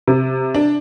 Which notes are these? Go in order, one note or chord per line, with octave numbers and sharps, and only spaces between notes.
C3
D4